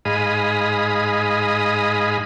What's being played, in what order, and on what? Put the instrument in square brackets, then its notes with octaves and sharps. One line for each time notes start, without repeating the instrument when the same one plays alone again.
[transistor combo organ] G#2 G#4 D#5 F5 B5 D#6